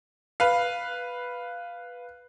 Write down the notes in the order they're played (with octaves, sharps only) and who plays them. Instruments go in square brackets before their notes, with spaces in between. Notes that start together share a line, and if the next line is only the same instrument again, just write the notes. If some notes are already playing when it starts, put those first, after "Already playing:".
[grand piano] B4 F5